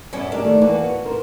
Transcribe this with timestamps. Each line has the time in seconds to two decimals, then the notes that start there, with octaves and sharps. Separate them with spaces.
0.13 F#2 B3 C#4 E4 D5
0.32 G#3 D4 G4 A#4
0.44 D#3 A3 A#3
0.62 E3 A#3 F#4 B4
0.84 B3
1.05 A#4 C5